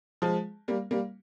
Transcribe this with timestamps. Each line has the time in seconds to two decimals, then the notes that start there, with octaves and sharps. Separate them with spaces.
0.22 F3 G#3
0.68 G3 A#3
0.91 G3 A#3